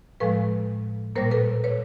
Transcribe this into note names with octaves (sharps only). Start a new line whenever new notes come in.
A2 F3 G#3 A4 B4
A#2 G3 A#3 A#4 C5
A4 B4
B4 C#5